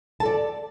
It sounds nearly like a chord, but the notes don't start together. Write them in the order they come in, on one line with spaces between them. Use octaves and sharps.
A5 A4 D5